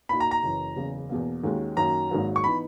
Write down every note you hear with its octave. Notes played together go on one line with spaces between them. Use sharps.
A#2 A#3 D#4 F#4 B5
A#5
A#5
F#1 F#2 E3
F#1 E2 C#3
E2 B2 A#3
D#2 D#3 G#3 C#4 F#4
F#2 D#3 F#3 A#3 A#5
G#1 G#2 F#3 A#3
C#6
E3 B3 D#4 B5